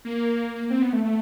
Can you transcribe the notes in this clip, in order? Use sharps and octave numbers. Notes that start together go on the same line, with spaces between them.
A#3
C4
B3
A3
A3